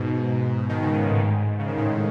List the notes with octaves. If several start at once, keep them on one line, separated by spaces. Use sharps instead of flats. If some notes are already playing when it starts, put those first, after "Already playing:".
Already playing: G#2 B2
D#3
C#3
B2
A2
G#2
C#3
D#3
A2 C#3